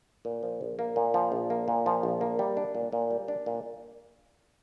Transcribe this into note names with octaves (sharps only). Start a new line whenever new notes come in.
A#2
F3
A#1
A#3
A#2
F3
A#1
A#3
A#2
F3
A#1
A#3
G3
D4
A#2
A#2
G3
D4
A#2